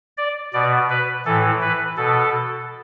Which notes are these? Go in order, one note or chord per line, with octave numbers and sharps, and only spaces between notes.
D5
B2 D5
B4
A2 E3 A4
B4
B2 A4